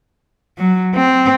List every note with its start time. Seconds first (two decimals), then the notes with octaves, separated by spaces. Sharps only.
0.58 F#3
0.95 C4